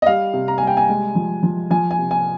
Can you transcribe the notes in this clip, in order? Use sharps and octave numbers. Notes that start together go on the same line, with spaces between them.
D#5
G3 F5
C3
A#5
G3 G#5
G5
G#5
G#3
F3
F3
F3 G#5
G#5
C3
G#5